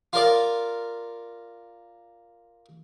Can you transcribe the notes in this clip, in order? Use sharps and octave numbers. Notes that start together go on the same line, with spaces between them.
F4 A#4 D5